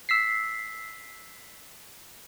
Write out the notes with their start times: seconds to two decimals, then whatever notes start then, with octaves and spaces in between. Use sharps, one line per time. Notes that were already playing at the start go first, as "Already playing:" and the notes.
0.09 E6 B6 C7